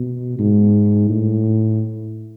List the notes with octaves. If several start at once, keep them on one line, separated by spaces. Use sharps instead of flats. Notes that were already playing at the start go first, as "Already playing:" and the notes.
Already playing: B2
G#2
A2